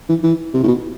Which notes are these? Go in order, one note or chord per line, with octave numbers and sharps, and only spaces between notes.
E3
E3
C3
A2
B2